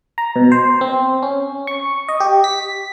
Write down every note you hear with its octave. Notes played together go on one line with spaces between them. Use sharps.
A#5
B2
C5
C4
C#4
C#6
D#5
G4
B6